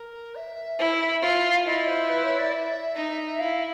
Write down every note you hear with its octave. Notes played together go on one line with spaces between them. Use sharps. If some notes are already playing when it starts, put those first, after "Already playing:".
Already playing: A#4
E5
E4
F4
E4 D#5
C5
B4
C#5
D5
E5
D#4
E4 F5